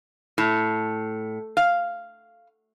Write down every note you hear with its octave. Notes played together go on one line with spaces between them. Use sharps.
A2
F5